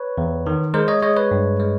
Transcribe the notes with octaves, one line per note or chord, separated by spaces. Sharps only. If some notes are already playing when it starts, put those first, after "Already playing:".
Already playing: B4 C#5
E2
D#3
G#3 A#4 C5
C#5 D#5
G#3 C#5 D#5
B4 C#5
G2
G#3